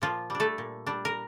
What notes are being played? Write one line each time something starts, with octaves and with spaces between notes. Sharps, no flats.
A#2 F3 F4
G3 D4
A3 A4
A#2
G3 D4
A#4